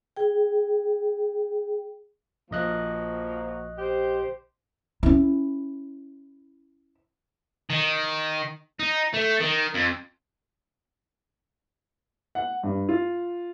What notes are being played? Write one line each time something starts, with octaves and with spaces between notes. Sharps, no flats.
G#4 G5
A#1 F3 A#3 F#4 D#5 F#6
G4 C5
C#4 E4
D#3
D#4
A3
D#3
F2
F#5
G2
F4